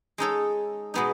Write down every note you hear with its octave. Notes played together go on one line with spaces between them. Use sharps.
G#3 D#4 A4 C#5
B2 G#3 B3 D#4